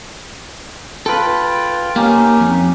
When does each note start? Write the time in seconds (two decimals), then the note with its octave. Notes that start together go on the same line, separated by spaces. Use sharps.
1.06 F4 A4 B4 G5
1.96 A#3 C#4 D#4 G4
2.40 F2